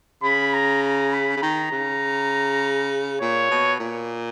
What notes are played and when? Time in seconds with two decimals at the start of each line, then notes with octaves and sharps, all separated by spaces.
0.23 C#3 B5
0.53 A#5
0.83 A#5
1.13 B5
1.37 C#3
1.42 D#3 A#5
1.72 C#3
3.21 A#2 C#5
3.51 B2
3.80 A#2